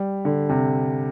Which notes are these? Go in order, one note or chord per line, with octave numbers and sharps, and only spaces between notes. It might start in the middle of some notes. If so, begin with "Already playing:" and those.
Already playing: G3
D3
C3